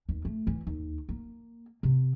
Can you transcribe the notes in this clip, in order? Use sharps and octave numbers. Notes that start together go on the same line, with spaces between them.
D#2
A3
E3
D#2
A#3
C3